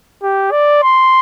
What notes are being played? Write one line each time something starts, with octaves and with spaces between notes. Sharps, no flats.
G4
D5
C6